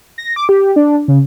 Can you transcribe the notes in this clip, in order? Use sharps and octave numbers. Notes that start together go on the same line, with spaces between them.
A#6
D6
G4
D4
C#3